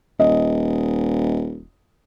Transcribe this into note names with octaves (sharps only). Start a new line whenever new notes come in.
D#1 D#5